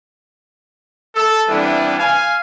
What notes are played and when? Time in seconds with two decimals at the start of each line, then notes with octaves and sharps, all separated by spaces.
1.15 A4
1.48 E3 G3 B3 C4 D4 E4
1.98 F5 G#5